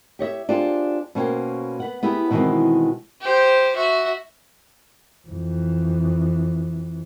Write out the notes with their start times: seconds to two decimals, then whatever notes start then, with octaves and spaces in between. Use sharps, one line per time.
0.19 G4 C#5 D#5 E5
0.49 D4 F4 G4 G#4 C5
1.15 B2 A#3 C#4 C5 C#5 G5
1.80 B3 B4 F#5
2.03 B3 E4 G4 G#4
2.31 B2 D#3 E3 G#3 B3 C4
3.21 G4 C5
3.76 F#4 E5
5.28 F2 E3